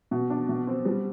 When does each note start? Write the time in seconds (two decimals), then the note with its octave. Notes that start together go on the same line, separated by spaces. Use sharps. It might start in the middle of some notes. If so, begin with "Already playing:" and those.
0.11 B2
0.30 D4
0.49 B2
0.67 C4
0.85 G3